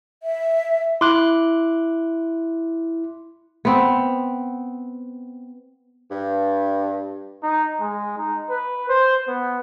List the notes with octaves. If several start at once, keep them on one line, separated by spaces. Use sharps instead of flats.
E5
E4 C6 D6 F#6
B3 C4
G2
D#4
G#3
D#4
B4
C5
B3